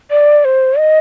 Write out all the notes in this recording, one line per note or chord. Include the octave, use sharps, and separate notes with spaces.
D5
C5
D#5